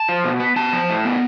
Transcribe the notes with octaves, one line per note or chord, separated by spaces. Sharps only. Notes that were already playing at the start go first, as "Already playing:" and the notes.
Already playing: A5
F3
B2
B3
B3 A5
F3
A2
B3